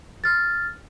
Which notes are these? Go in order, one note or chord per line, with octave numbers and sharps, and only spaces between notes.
F6 A6